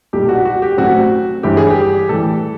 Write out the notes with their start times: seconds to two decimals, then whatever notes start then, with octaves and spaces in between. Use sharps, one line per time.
0.13 B1 A#2 G3 G4
0.29 F#4
0.45 F#4
0.62 G4
0.78 A1 A2 F#3 A3 C4 F#4
1.43 G1 G2 E3 G4
1.57 G#4
1.70 G4
2.09 A2 E3 G3 A4